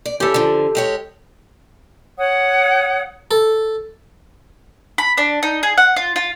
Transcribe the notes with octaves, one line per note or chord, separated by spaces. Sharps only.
D5
C#4 E4 G4 A4
D3 F3
G#3 G4 C#5
C#5 F#5 D#6
A4
B5
D4
D#4
G#4
F#5
F4
F4